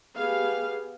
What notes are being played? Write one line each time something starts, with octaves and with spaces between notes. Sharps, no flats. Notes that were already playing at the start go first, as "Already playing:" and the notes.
B3 G4 G#4 F5